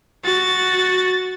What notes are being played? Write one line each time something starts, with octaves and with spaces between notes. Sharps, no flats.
F#4 A6